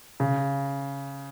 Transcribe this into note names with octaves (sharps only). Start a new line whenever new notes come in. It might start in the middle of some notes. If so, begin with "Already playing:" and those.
C#3